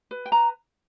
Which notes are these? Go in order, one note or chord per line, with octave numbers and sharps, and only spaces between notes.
B4
G5
B4 A#5